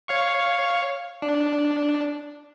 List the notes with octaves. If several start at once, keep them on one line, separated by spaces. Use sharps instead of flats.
C#5 F5 C#6
D4